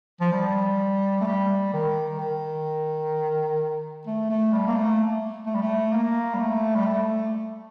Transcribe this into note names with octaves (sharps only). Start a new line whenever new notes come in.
F3
G3
A3
G3
D#3
D#3
A3
A3
G3
A#3
A3
A3
G3
A3
A#3
G3
A3
G3
A3